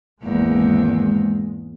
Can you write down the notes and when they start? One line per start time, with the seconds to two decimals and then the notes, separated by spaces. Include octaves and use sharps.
0.23 G#1 E2 G#3 A#3